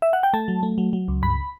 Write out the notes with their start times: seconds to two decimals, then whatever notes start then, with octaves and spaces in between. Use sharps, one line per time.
0.02 E5
0.13 F#5
0.23 G5
0.33 A3 A5
0.48 F#3
0.63 A3
0.78 F#3
0.93 F#3
1.08 C#2
1.22 G2 B5